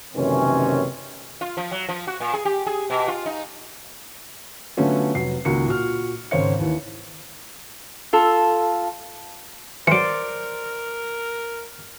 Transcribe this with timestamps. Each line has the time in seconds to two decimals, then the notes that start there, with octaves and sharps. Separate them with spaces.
0.14 F#1 C3 D#3 E3 C4 C#4
1.41 F4
1.57 F3
1.71 F#3
1.89 F3
2.07 F#4
2.20 A#2
2.34 G#4
2.45 G4
2.67 G#4
2.90 B2
3.08 F4
3.26 D#4
4.77 D3 F#3 A3 B3 C#4 F4
5.15 F1 F#3 B4 C7
5.45 C#2 D#3 A#3 F#4 C#7
5.66 A#2 F#4 F6
6.31 G#1 C#3 C5 C#5 C#7
6.59 D#2 E3
8.13 F4 A4
9.87 E3 F#3 A#4 C5 D5 C#7 D7